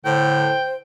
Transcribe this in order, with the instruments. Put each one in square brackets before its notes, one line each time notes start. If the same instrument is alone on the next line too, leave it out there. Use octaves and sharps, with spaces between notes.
[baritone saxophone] A2 [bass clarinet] D3 [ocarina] C5 [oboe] G5